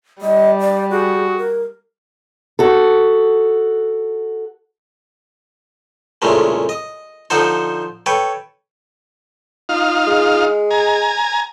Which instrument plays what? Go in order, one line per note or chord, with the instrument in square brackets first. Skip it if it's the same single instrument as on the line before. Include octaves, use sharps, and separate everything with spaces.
[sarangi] G3 [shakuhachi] D#5
[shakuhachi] D5
[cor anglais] F#4 [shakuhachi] G#4
[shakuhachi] A#4
[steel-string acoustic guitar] F#4 A4
[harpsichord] C2 F2 A#2 C#3 G#3 A3
D#5
D3 F3 D4 D#4 A4 C5
A4 B4 C#5 G5
[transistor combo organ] D#4 F4 F5
[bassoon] G#3
[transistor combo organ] G#5 A#5